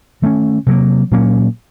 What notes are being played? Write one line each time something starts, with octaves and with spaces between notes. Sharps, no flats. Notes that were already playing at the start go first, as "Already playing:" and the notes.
D#3 A3 C#4
C3 F#3 A#3
A#2 F#3 A#3 C#4